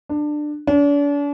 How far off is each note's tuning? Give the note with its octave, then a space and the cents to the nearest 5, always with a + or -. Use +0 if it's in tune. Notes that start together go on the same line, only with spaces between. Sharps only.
D4 +20
D4 -40